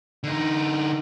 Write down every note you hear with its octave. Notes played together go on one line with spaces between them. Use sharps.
D3 D#4